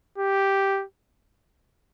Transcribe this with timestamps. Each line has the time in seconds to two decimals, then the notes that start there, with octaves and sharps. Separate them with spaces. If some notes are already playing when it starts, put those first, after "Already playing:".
0.18 G4